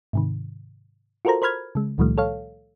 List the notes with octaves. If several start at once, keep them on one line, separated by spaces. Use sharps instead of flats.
G#2 C3 D#3
F4 F#4 A4 A#4 C5 A#5
A#4 C5 B5 F6 G#6
C#3 G#3
C#2 A#2 D#3 F3 G3 A3
A4 C#5 F5